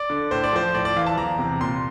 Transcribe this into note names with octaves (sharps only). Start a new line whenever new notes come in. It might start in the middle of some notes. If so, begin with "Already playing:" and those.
Already playing: D5
D3
A2 C5
D5
F3 C5
A2 D5
D5
E3 F5
A5
E2 A#5
C3
A#2 C6